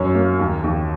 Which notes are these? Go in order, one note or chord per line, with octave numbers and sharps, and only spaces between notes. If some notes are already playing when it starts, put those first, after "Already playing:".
Already playing: F#2 C#5
A#3
D#2
D#2